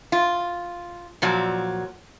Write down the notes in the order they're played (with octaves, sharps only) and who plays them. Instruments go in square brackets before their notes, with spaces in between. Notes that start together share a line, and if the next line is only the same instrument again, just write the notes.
[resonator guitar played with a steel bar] F4
A#2 F3 F#3